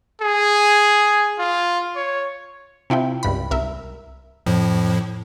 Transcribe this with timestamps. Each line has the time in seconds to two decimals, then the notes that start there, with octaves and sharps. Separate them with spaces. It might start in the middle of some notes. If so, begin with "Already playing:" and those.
0.22 G#4
1.39 F4
1.96 C#5
2.90 C3 E4 F4 G5
3.23 C#2 G2 B5
3.51 C2 A#4 E5
4.46 F2 A2 F3